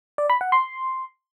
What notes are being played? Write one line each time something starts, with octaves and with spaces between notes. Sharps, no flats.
D5
B5
F#5
C6